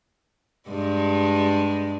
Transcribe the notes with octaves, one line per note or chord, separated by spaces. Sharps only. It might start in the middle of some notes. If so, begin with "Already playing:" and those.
G2 G3 G#3